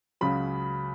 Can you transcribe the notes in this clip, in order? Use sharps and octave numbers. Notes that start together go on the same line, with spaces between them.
C#2 C#3 F#3 B5